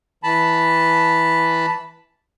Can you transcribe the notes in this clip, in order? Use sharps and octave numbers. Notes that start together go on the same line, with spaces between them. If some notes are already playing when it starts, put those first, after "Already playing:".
E3 A5 B5